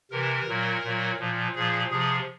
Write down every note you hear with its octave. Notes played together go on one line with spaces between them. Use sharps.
C3 E3 A#4
A#2 F#3
A#2 F#3
A#2 F3
A#2 F3 G#4
C3 F3 G#4